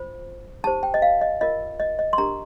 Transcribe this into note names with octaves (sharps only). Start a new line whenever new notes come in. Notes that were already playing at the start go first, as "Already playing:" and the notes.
Already playing: F4 C5
D#4 G4 C5 A5
G5
D#5
F5
D#5
F4 A#4 D#5
D#5
D#5
C6
D4 G4 A#4 A#5